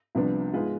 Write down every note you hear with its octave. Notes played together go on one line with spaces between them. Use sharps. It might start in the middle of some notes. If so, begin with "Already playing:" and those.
C2 C3 F3 B3 D4
G#2 G#3 B3 F4 B4